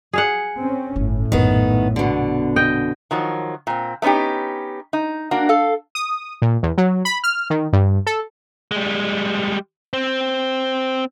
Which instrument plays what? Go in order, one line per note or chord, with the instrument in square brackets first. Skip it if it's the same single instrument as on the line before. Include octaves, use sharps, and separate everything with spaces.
[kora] G#4 F5 F#5
[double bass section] C4 C#4
[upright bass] G1 C#4 [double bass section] A2
[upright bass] A#1 F#2 [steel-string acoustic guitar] D#3 B3
[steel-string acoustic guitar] B2 D3
[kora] D#5 G5
[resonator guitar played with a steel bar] D#3 F3 F#3
A#2 C4
A3 B3 C#4 D#4 G4
D#4
A#3 D4 F#4
A4 F5
[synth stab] D#6
A#2
E2
F#3
B5
F6
D#3
G2
A4
[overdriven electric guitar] G3 G#3
C4